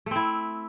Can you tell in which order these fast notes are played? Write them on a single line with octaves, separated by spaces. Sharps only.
A3 C4 E4